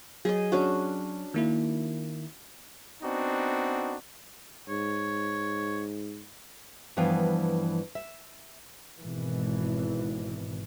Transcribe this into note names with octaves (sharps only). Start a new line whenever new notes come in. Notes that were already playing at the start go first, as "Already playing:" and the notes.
F#3 G#4 D#5
C#4 D4 F#4
D#3 A#3 E4
B3 C4 D4 D#4 F#4
G#2 C#5
G2 E3 F3 B3 F5 G5
E5
G#1 G#2 B2 E3